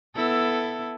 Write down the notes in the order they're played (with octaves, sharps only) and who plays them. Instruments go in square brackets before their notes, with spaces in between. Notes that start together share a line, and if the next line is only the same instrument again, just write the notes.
[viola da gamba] B3 E4 A4